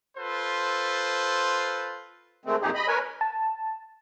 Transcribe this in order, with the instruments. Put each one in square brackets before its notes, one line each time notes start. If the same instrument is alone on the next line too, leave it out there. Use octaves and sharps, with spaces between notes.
[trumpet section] F4 A4 B4 C5
[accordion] D#3 G#3 A3 C4
F2 A#2 D#4 G4 G#4
D#5 B5
A#4 B4 C#5 G#5
[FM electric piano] A5